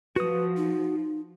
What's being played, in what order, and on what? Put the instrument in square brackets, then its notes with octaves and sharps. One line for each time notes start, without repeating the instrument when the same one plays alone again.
[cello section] F3 [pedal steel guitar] F#4 D#6 [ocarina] B4
[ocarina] D#4